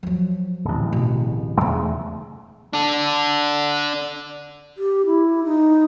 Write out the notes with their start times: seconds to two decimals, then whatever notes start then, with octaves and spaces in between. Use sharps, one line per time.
0.03 F3 F#3
0.65 D1 A1
0.93 B2
1.61 E2 C#3 A3 D#4
2.73 D4 A4
4.78 G4
5.06 E4
5.45 D#4